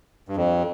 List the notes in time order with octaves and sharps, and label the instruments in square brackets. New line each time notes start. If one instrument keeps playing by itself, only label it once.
[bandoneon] G2
F2